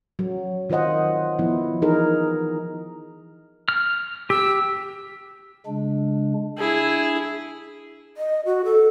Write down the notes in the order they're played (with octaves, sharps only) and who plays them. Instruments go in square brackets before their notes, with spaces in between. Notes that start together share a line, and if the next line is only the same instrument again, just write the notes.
[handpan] F#3
D#3 F4 C5 D#5 F#5
F3 B3 E4
E3 D#4 G#4 A#4
[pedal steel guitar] F6
[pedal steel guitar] G4 [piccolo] E6
[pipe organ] C#3 G#3 D4
[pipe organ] D4 [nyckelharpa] E4 G#4
[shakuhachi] D#5
F#4
A4